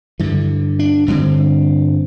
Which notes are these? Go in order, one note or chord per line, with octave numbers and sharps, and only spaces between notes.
G2 D3 E3
D4
G2 D3 C4